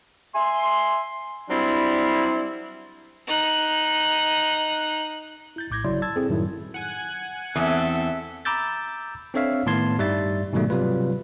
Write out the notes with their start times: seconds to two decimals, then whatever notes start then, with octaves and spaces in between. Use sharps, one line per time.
0.34 E5 G#5 C6
1.50 F#3 G3 C4 D4 E4
3.27 D#4 F#6
5.56 E4 G6 A6
5.70 A#1 A2 D6 G6 G#6 A#6
5.84 G1 C#3 F#3 E4 D5 C6
6.02 A5 E6 G#6 A6
6.16 C4 E4 G#4 A4
6.29 F#2 A2 D#3 F#3 G3 E4
6.74 F#5 G#5 F#6
7.56 E2 C4 A4 E5
8.45 A#5 B5 D6 E6 G6 A6
9.34 C4 D4 A4 C#5 E5 F5
9.66 A2 D#3 B3 A5 C6 G#6
9.99 G2 G3 D#4 E5 A6
10.53 G#2 B2 D#3 F#3 G3 A3
10.70 C3 F#3 G3 F4 B4